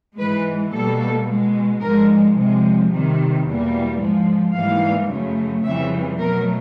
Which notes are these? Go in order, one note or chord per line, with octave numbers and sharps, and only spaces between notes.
G#2 E3 G#3 B4
B2 G3 A#3 A4
B2 G#3
G#2 F3 G#3 A#4
C3 F3 G#3
C3 D#3 G3
E2 B2 G3 A#3
G#2 F3 G#3
G#2 E3 G3 A#3 F5
F#2 C#3 F#3 A3
F2 C#3 E3 G3 E5
B2 F#3 A3 A#4